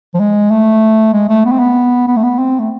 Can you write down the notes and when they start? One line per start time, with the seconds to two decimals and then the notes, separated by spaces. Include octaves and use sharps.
0.14 F3
0.20 G#3
0.51 A3
1.13 G#3
1.29 A3
1.45 B3
1.52 C4
1.59 B3
2.08 B3
2.16 A3
2.23 B3
2.39 C4
2.59 A3